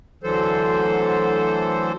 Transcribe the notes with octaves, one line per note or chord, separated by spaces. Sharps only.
D2 D3 E3 F#3 A4 C5